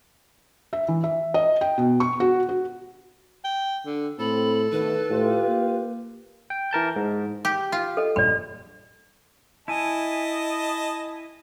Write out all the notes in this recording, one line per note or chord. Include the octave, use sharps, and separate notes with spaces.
E5
E3
E5
D#5
G5
B2
C#6
F#4
F#4
G5
D3
A2 C4 A4 B5
D2 B2 D#3 A3 B4
A2 F4 G4
A#3
G5
E3 A#4 A5 G6
G#2
G4
F4
A4 D#5
F1 A#1 G2 D5 B5
E4 D#5 G#5 A5